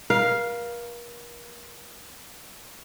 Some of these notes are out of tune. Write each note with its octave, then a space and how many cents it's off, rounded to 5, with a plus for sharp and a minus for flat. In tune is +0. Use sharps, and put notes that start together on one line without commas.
A#4 +40 F5 +0